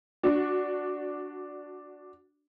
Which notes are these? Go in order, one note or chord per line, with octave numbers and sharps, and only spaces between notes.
D4 F#4